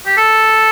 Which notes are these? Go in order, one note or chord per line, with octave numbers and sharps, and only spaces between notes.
G4
A4